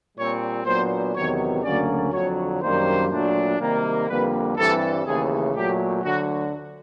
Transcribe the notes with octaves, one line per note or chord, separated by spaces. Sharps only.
A#2 G3 C4 C#5
A#2 F#3 B3 D4 C5
E2 C3 D#3 F#3 B3 C#5
D2 C#3 F#3 A#3 C#4 D5
F2 D3 F#3 C#5
F#2 D#3 G3 A#3 D4 C5
A#2 F#3 A3 D4
C3 D#3 G3 A#3
F2 D3 G3 A#3 B4
G2 E3 G3 C4 A4
D#2 C#3 E3 A3 G#4
A#2 F#3 A3 G4
D2 D3 F#3 F#4